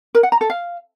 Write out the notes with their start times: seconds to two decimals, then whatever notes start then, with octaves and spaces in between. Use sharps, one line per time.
0.15 A#4
0.23 F#5
0.32 A#5
0.41 A4
0.50 F5